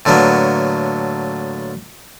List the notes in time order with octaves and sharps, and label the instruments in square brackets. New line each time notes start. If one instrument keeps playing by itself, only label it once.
[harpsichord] A2 D3 F#3 A#3 B3